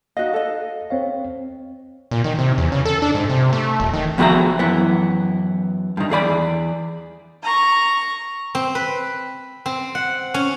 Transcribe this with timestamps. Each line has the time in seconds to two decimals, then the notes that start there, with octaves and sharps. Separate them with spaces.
0.17 D#4 F#4 D#5 F5
0.33 A4 D#5
0.90 C4 C#5 F5
2.11 A#2
2.24 D#3
2.38 C3
2.58 E2
2.72 C#3
2.85 A4
3.02 D4
3.15 G#2
3.29 C3
3.53 A3
3.80 D#1
3.93 D#3
4.18 F3 B3 F#4 G#4 E5 A#5
4.59 F#2 E3 B3
5.97 G2 D#3
6.10 E2 G#4 D5 B5
7.43 A#5 C#6
8.55 C4
8.75 B4
9.66 C4
9.95 F#5
10.34 C#4